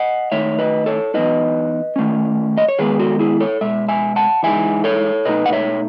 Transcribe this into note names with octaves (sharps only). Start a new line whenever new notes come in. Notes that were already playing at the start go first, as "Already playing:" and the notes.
Already playing: D#5 F#5
D#3 A3 D#4 C#5 E5
B4 D#5
A4 C#5
E3 B3 D#4 B4 D#5
D#3 A3 C#4
D#5
C#5
D#3 G#3 B3 G#4 B4
F#4 A4
E4 G#4
A4 C#5
B2 G#3 E5
E5 G#5
F#5 A5
E3 G#3 D#4 E5 G#5
A4 C#5
B2 A3 D#4 B4 D#5
F#5
C#5 E5